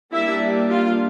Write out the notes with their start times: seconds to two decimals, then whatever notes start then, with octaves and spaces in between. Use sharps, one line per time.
0.12 G3 A#3 D4 E4 E5
0.70 F4 F5